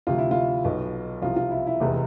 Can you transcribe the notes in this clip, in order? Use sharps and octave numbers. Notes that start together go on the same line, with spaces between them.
D2 C3 F3 F4
E4
F4
B1 B2
C2 C3 F3 F4
F4
E4
E4
F1 E2 C3